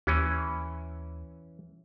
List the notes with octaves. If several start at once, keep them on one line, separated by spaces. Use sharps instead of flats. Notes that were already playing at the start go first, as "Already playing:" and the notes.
D#2 E3 C#4